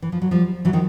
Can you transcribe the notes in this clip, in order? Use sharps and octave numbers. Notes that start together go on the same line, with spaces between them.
E3
F3
F#3
F3 G3
E3 F#3
D#3 F3